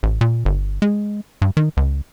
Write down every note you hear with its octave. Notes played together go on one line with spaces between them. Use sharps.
A1
A#2
G1
G#3
G2
D#3
C#2